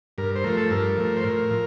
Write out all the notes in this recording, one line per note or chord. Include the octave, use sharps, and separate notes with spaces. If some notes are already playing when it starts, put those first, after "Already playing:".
G2 A#4
C5
F3 A3 A#4
A4
G2 A#4
F3 A3
C5
A2 A#4
F3